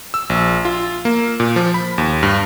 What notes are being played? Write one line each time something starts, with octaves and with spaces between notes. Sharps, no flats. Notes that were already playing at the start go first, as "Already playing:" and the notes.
E6
A#1
F4
A#3
A#2
F3
B5
D#2
G2